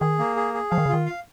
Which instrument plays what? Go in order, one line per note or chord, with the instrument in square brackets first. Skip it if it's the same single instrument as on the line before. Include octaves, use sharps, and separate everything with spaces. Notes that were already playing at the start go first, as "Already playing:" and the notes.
[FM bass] D#3 [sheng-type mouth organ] G#4
[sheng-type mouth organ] A#3
G#4
G#4
[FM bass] F3 [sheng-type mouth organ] F5
[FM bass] D#3
C#3
[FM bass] D#3 [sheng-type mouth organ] F4
[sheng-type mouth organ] F5